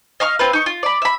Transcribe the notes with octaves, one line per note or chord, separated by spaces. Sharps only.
D#5 F5 C#6 F6
C4 F4 B4
D#4 C#6
F4
D5 B5
E5 B5